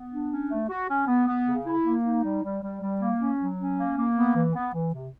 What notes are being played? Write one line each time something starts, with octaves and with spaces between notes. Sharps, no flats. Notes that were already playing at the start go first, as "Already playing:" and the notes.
Already playing: B3
D4
C#4
A3
F#4
C#4
B3
B3
C#3
E4
A#3
D#4
G3
G3
G3
G3
A#3
C#4
F#3
C#4
A#3
A#3
B3
E3
B3
E3
C3